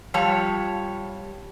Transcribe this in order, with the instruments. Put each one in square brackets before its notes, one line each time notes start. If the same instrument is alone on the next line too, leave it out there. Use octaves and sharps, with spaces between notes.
[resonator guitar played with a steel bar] F3 G3 C#5 A5